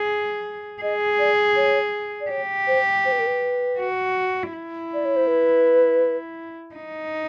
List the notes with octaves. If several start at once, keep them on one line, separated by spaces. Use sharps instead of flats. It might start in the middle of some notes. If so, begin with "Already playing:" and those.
Already playing: G#4
G#4 D#5
D5
C#5
D5
G4 C#5
C5
C5
B4
A#4
B4
F#4
E4
D5
C#5
C5
B4
D#4